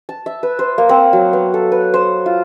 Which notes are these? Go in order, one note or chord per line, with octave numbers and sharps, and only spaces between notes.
A5
E5
B4
C5
A#3
C4
F#3
B3
A4
B4
C5
F4